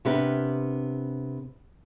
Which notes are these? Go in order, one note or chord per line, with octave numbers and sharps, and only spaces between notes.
C3 B3 D4 G4 A#4 B4